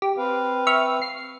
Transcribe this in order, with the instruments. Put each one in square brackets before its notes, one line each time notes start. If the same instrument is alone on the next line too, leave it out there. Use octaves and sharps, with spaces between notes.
[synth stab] G4
[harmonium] C4 B4 F5
[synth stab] E5 C#6 F6
C7